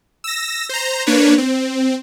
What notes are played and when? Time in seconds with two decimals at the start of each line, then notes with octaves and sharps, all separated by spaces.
0.24 E6 A#6
0.69 C5 A#5
1.07 A#3 D4 B4 C#5
1.38 C4